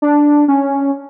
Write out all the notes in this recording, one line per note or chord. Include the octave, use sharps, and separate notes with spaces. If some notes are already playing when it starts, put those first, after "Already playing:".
D4
C#4